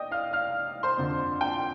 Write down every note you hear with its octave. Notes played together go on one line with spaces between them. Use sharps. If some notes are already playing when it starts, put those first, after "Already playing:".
Already playing: D5 D#5 G5 D#6
F5 F6
F5 F6
C5 C6
F2 D3
G5